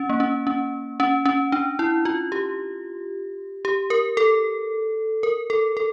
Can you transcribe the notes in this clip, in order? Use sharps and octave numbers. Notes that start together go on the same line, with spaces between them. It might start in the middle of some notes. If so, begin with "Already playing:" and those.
Already playing: C#4
A#3
C#4
C#4
C#4
C#4
D4
E4
F4
G4
G4
A#4
A4
A#4
A4
A4